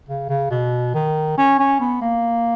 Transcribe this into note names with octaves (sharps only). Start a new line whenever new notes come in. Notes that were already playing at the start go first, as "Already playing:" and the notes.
C#3
C#3
B2
D#3
C#4
C#4
B3
A#3